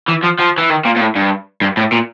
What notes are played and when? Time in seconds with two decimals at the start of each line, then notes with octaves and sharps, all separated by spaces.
0.09 E3
0.24 F3
0.40 F3
0.58 E3
0.70 D#3
0.85 A#2
0.96 A#2
1.00 A2
1.16 G2
1.61 G2
1.77 A2
1.92 A#2